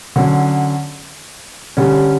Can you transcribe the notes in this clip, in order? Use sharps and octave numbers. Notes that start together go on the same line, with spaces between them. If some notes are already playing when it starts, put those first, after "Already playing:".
D3 F#3 C#4
D3 G3 C#4